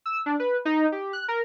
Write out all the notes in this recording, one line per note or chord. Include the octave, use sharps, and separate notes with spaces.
E6
D4
B4
D#4
G4
F#6
A#4